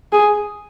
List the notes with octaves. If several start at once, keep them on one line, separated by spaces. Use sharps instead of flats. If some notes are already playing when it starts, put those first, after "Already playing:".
G#4